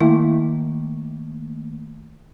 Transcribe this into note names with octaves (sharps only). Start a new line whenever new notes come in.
D#3 A3 A#3 E4